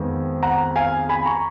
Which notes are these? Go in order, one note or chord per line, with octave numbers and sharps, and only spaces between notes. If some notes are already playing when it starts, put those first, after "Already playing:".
Already playing: F2 D#3 G#3 B3
F#5 A#5
F5 G#5
G#5 B5
A#5 C#6